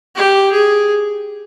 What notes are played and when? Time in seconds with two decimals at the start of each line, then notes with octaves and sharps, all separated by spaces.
0.16 G4
0.52 G#4